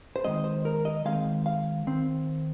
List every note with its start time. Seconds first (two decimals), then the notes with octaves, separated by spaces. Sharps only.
0.16 C5
0.24 D#3 G#3 C4 D#5
0.44 C5
0.65 A#4
0.85 D#5
1.05 D#3 G#3 C4 F5
1.46 F5
1.87 D#3 C4